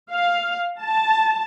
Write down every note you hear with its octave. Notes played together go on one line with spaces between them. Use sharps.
F5
A5